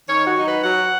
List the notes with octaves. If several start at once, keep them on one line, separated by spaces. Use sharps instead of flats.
D#3 C#5
F#4
F#3 D#4
B4
F#3 F#5